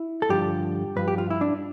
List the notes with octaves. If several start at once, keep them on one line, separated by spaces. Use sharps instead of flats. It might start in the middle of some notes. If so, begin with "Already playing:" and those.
Already playing: E4
A4
G2 D3 F3 G4
G2 F3 B4
G4
F4
E4
D4